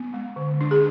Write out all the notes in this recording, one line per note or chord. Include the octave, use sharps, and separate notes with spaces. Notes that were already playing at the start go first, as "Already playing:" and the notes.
Already playing: B3
G#3
D3
D4
G#4